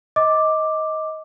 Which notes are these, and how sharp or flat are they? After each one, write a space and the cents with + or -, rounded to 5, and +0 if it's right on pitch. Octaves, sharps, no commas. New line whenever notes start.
D#5 +20 D6 +5